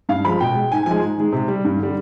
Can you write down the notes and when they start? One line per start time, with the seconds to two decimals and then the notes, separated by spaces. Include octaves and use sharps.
0.09 G2 F5
0.25 F3 G#3 B5
0.40 B2 G5
0.55 G#3
0.71 G#2 G#5
0.86 F3 G#3 G#5
1.02 G#2
1.18 D#3 G#3
1.33 C3
1.48 G3
1.65 G2
1.79 D3 G3